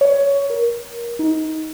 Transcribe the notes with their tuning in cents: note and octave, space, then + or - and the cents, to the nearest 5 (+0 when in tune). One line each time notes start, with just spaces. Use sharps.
C#5 +10
A#4 +20
D#4 +20